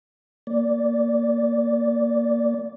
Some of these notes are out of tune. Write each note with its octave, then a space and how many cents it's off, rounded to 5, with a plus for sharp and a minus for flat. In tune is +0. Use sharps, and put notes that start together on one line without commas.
A#3 +0 D5 -15